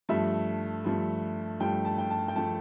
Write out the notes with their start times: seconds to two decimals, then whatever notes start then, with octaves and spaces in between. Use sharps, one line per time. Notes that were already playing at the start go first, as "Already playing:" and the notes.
0.09 G2 F3 A3 E5
0.85 G2 F3 A3
1.60 G2 F3 A3 G5
1.85 A5
1.98 G5
2.10 A5
2.28 G5
2.36 F3 A3 A5